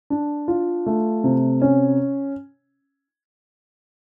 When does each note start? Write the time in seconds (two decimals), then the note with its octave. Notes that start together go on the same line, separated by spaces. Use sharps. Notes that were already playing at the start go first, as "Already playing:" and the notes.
0.10 D4
0.48 F4
0.86 A3
1.24 C3
1.62 C#4